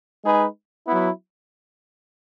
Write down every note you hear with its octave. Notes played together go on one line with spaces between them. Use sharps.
G#3 D#4 G#4 B4
F#3 B3 E4